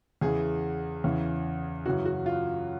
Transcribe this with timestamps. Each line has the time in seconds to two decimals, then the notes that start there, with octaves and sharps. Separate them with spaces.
0.21 E2 C#3 E3 G#4
1.04 E2 C#3 E3
1.86 F#2 C#3 E3 F#4
2.05 F#4
2.26 F4